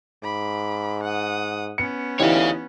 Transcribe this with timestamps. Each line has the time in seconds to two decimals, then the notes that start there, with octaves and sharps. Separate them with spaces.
0.24 G#2 B5 D6
1.03 F#5 D#6
1.78 B3 C#4 C#7
2.20 D2 E3 D#4 G4 C#5 F5